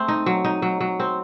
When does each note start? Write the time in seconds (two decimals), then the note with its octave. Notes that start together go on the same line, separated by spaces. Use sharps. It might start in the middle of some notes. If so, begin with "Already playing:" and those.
Already playing: A3 C4
0.08 D#4
0.26 F#3
0.45 D#4
0.62 F#3
0.80 F#3
1.00 C4